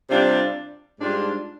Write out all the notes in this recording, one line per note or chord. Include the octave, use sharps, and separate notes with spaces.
C3 G3 D4 F4
G#2 G3 D4 F4